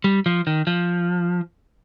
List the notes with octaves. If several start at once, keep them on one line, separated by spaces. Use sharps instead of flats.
G3
F3
D#3
F3